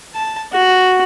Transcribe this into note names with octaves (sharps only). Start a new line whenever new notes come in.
A5
F#4